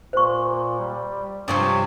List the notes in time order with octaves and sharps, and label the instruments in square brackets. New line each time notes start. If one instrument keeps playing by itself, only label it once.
[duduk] A#2 [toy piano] C5 C#6
[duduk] G3
[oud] G2 C3 F3 [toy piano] D4 D#6 [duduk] C#5